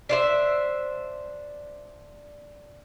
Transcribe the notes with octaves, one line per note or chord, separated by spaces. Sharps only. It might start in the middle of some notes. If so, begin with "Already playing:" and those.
D4 C5 E5